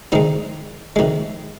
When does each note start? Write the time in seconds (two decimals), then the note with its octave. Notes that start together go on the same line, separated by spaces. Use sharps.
0.12 C3 D#3 G#3 C4 D#4
0.96 C3 D#3 G#3